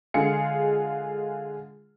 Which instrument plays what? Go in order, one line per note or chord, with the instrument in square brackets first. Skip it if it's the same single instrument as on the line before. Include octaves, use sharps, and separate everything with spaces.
[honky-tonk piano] D3 G#3 F4 G#4 C#7